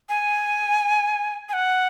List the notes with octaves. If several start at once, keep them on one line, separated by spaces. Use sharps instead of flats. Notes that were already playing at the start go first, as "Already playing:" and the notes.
G#5
G#5
F#5